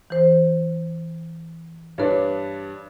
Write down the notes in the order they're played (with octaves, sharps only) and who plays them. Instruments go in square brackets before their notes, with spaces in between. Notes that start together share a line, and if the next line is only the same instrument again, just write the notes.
[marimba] E3 C5
[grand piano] G2 D4 [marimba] B4 C#5